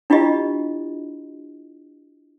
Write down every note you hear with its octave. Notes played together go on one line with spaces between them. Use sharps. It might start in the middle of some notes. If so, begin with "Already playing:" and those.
D4 E4 F4 G4 D#5